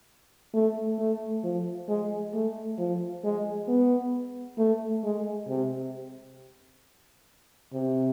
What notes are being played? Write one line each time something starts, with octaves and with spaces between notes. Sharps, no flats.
A3
A3
F3
G#3
A3
F3
G#3
B3
A3
G#3
C3
C3